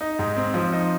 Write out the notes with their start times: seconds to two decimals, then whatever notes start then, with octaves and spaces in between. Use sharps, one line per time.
0.01 D#4
0.19 G#2
0.37 C4
0.54 F3
0.72 D#4